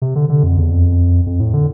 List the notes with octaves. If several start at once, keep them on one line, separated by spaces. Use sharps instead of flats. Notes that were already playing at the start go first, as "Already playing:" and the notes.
C3
D3
D3
F2
E2
F2
F2
A2
D3